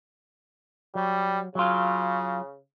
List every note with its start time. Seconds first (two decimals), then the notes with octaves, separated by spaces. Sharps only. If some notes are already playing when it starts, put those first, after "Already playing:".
0.95 F#3 G3
1.55 C#3 F#3 F4